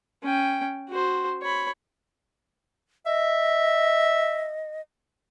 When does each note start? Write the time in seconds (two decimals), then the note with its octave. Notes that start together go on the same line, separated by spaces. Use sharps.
0.23 C#4 G5
0.89 F#4 C5
1.42 C#5 B5
3.06 D#5 E5